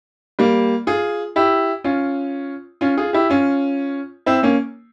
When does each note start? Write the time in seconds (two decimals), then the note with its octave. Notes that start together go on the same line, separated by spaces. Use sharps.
0.39 G3 A#3
0.87 F4 G#4
1.36 E4 G4
1.84 C#4 F4
2.81 C#4 F4
2.97 F4 G#4
3.13 E4 G4
3.30 C#4 F4
4.26 C4 E4
4.43 A#3 C#4